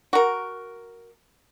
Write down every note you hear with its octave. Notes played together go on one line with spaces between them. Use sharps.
F#4 A#4